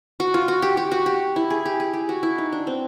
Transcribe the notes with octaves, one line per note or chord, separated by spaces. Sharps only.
F#4
F4
F#4
G4
G4
F#4
G4
E4
G#4
G4
G#4
G4
F#4
E4
D#4
D4
C4